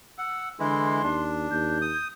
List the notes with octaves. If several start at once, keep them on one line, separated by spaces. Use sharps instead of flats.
F#5 E6
D3 E3 G#3 E4 C6
D#2 D4
D#2 G6
D#6